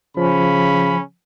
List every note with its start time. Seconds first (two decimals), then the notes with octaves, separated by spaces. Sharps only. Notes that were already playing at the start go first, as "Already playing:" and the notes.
0.17 C#3 F3 C#4 B5